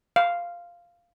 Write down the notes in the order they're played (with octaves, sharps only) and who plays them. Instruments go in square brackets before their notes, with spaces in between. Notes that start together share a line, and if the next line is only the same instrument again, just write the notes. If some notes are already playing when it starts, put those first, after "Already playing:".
[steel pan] F5